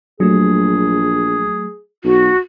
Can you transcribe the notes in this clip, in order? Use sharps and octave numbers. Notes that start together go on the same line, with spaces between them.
A#1 F#3 A3 G#4
B1 F#4